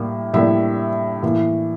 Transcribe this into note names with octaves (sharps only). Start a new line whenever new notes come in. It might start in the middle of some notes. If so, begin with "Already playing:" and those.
Already playing: A2 G3 A#3
A2 G3 A#3 E5
A2 E3 A#3